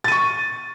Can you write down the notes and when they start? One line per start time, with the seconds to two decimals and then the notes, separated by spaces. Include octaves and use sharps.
0.04 A6
0.08 D#7
0.12 C#6